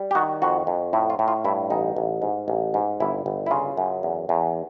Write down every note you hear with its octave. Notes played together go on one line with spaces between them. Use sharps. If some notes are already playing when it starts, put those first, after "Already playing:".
Already playing: G3
G4
D#3 F#4
F2 F#4
F2
A2 E4
F4
A2
F4
G2 E4
A1 D#4
A1
G#2
A1
G#2
G1 E4
G1
E4
C#3 F4
F#2
E2
E2